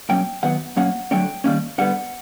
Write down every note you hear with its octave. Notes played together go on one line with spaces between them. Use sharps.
B2 F#3 A#3 C#4 G5
D#3 F#3 B3 F#5
B2 F#3 A#3 C#4 F#5
D3 F#3 A3 C#4 G5
D#3 G3 A#3 C#4
D3 G3 B3 F#5